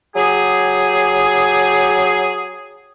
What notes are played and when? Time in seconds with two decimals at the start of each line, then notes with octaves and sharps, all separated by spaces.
0.16 F#3 G4 G#4